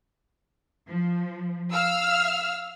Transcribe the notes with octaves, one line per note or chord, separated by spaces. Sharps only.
F3
F5 E6 F6